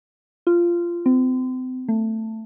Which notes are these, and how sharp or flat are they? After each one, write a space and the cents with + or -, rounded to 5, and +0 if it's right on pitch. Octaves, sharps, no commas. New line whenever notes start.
F4 -15
C4 -35
A3 +15